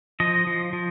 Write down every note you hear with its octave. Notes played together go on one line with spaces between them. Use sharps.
F3 D#5
F3
F3